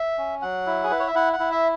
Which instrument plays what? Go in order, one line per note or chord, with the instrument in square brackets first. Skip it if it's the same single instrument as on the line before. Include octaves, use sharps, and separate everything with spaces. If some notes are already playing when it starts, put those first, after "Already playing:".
Already playing: [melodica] E5
C#4
F#3 F#5
E4
G#4
E4 B4
C#5
E5
E4 F#5
F#5
E4
E5